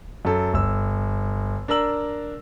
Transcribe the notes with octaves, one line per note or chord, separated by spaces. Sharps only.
F#2 A4
G1 E6
D4 A#4 A#5 E6 F#7